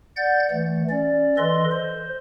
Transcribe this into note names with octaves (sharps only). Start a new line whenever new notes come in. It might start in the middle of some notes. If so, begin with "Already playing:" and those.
D5 F#5 G6 A6
E3 A3
C#4 D5
E3 A4 B4 D#5 C6
C5